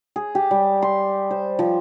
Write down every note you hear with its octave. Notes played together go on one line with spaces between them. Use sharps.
G#4
G4
G3
C6
C5
F3